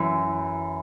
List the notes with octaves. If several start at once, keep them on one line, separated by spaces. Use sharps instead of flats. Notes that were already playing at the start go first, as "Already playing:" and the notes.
Already playing: F#2 E3